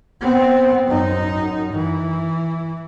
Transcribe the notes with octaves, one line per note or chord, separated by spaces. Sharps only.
B3 C4
F#2 D#4
E3